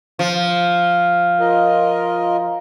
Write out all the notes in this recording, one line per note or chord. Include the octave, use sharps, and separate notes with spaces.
F3
F4 A#4 D#5